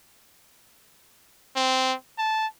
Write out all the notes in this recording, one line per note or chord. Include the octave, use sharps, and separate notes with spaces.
C4
A5